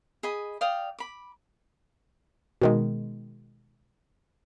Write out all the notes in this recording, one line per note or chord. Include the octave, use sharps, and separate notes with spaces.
G#4 D#5 B5
D5 F5 G5 D#6
B5 D6
B2 D#3 G#3